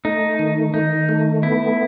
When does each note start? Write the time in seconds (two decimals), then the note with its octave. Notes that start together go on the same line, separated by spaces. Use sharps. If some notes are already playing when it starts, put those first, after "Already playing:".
0.05 A3 D#4
0.39 D#3
0.74 D#3 D#4
1.09 A3
1.43 B3 E4